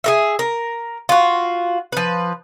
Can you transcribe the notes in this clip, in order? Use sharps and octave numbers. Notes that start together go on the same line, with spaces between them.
G#4 A#4 E5
A#4
F4 F#4
F3 B4